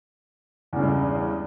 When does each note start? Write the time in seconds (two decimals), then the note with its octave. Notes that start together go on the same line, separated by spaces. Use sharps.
0.73 E2
0.76 C#3
0.79 G2
0.82 G#3